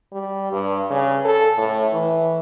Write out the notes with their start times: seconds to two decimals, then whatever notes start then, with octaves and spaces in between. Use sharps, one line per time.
0.13 G3
0.52 G2
0.90 C#3
1.25 A4
1.58 A2
1.93 E3